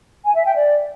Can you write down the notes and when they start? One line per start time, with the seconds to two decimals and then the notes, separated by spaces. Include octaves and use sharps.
0.24 G#5
0.35 E5
0.45 G5
0.55 D5